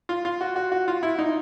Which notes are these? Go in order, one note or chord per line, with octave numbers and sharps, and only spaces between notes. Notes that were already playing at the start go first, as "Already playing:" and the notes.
F4
F4
F#4
F#4
F#4
F4
E4
D#4